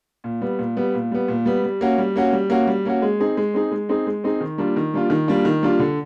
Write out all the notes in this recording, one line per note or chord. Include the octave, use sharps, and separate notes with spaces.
A#2
G3 B3
A#2
G3 B3
A#2
G3 B3
A#2
G3 B3
G3
A#3 C#4 F#4
G3
A#3 C#4 F#4
G3
A#3 C#4 F#4
G3
A#3 C#4 F#4
G#3
C4 D#4 G#4
G#3
C4 D#4 G#4
G#3
C4 D#4 G#4
G#3
C4 D#4 G#4
D#3
G3 A#3 D4 F4
D#3
G3 A#3 D4 F4
D#3
G3 A#3 D4 F4
D#3
G3 A#3 D4 F4
D3